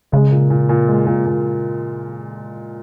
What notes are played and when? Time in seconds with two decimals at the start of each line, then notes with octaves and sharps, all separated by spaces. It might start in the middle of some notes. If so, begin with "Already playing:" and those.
0.12 C#3 G#3
0.31 A#2
0.50 A#2
0.69 A#2
0.88 G#3
1.07 A#2
1.26 A#2